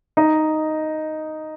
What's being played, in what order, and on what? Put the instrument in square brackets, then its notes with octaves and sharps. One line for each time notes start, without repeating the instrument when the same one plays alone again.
[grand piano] D#4